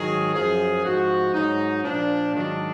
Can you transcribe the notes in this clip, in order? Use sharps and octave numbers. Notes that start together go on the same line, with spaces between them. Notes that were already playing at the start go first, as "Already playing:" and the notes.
Already playing: G#2 D#3 F#3 G#4
F#2 F3 G#4
G#2 F3 F#4
G#2 F#3 D#4
A#2 F3 D4
G#2 D#3 F#3 D4